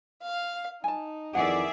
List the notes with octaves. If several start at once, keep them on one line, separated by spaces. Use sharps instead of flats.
F5
D#4 G#5 A5
F2 D#3 E3 G#4 D5 E5 F#5